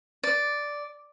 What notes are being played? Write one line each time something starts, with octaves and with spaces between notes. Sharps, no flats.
D5